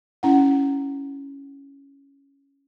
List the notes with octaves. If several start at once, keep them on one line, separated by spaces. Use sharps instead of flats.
C#4 E4 F#5